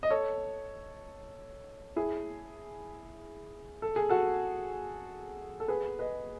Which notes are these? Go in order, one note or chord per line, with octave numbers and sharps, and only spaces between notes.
D#5
A4 C#5
E4 G#4
A4
G#4
F#4 A4
A4
G#4 B4
B4 D#5